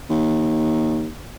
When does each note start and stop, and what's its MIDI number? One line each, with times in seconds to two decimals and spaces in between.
0.10 1.09 39